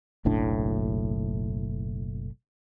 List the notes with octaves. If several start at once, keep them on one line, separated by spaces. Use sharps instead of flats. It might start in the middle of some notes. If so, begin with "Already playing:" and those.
F#1 B1 A2 D4